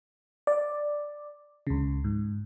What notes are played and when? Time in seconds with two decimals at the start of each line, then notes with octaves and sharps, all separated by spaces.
0.47 D5
1.67 C#2 C#3
2.04 G#2